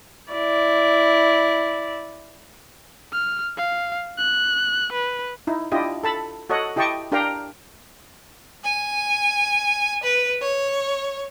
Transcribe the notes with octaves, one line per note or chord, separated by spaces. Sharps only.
E4 D5
F6
F5
F#6
B4
D#4 E4
D4 E4 F4 G4 D#5
A4 A5 B5
F#4 A4 C#5 D#5 F#5
E4 G4 D#5 G5 A5 C#6
D4 G4 A#4 F5 G5 A#5
G#5
B4
C#5